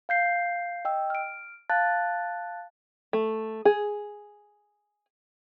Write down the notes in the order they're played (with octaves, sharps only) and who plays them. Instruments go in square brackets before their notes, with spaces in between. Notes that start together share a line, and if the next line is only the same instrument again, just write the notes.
[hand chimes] F5 G6 C7
D#5 G5 E6
F6 D7
F5 A5 F#6 A6
[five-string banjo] A3
G#4